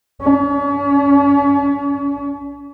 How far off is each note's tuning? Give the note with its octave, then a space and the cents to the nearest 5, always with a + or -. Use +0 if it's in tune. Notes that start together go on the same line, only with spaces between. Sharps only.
C#4 +40